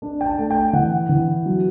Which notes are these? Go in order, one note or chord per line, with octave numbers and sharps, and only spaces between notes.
D4
G5
A5
A3
G5
E3 F#5
E3
F#3